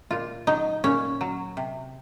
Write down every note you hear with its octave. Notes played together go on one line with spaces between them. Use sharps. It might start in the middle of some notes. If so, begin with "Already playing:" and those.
A#2 F4
F#3 D#4
A#2 C#4
F#3
C3